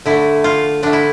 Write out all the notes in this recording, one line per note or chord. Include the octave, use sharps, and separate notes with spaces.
D3 A3 E4
F4
D3 A3 D4
E4